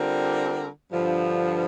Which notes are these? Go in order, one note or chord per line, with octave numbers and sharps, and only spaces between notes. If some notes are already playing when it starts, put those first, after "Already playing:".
Already playing: D3 G3 C4 F4 A#4
G2 D3 F3